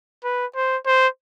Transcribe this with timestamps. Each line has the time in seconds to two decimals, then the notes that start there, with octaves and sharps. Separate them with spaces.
0.24 B4
0.55 C5
0.86 C5